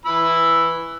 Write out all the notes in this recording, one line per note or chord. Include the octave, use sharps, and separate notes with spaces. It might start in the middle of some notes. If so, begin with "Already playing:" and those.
E3 B5 E6